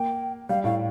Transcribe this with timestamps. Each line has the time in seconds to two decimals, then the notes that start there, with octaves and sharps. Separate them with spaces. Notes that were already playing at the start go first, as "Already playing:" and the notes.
Already playing: A#3 G5
0.49 G3 F5
0.64 A2 F5